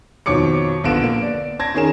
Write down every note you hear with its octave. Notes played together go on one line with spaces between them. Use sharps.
F2 B2 D#3 C#5 D6 C#7
A#1 D3 B3 F4 D7 E7
A#3
D5
A5 G#6 A#6
D#3 C#4 G#4 A#4 E7